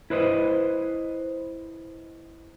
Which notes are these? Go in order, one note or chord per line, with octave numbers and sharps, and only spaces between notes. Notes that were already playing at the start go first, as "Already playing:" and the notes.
E4 B4 C5 D#5